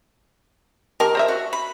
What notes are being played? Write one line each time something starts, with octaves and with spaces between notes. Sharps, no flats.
D#3 G4 A#4 A5
C5 D#5 E5
F#4
B5